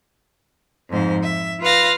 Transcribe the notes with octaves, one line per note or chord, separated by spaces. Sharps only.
F2 G#2 C5
E5
F4 B4 F5 A#6